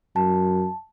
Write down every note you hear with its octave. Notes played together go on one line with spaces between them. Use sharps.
F#2 A5